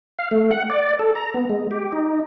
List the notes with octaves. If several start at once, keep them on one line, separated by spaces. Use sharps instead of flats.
F5
A3
F#5
D5
A4
A#5
B3
G#3
G4
D#4